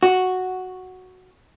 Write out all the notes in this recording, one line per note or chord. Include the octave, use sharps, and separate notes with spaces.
F#4